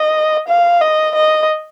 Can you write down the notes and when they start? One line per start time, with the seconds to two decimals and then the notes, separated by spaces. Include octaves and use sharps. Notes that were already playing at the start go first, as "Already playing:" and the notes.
Already playing: D#5
0.48 F5
0.81 D#5
1.15 D#5